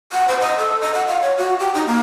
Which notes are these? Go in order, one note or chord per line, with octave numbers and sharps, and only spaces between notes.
F#5
C5
D#5
A4
D#5
F#5
F5
C#5
F#4
G4
D#4
A#3